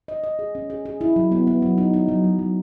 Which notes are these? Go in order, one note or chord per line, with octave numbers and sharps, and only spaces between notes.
D#5
D#5
G#4
C#4
G#4
G#4
E4
F#3
B3
B3
F#3
D#4
D#4
F#3
F#3
F#3